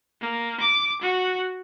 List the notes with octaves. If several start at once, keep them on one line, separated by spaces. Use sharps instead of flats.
A#3
D6
F#4